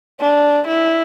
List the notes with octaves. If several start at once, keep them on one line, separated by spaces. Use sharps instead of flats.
D4
E4